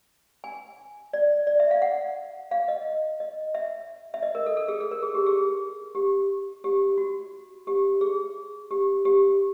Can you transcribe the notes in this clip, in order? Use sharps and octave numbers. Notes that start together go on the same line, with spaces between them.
G#5
D5
D5
E5
F5
F#5
F5
D#5
D#5
E5
E5
D#5
A#4
A4
A4
G#4
A4
A#4
G#4
G4
G#4
G4
G4
F#4
G4
G#4
G4
G4